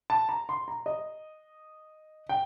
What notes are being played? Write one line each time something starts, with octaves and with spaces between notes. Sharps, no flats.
A5
A#5
C6
A#5
D#5
G5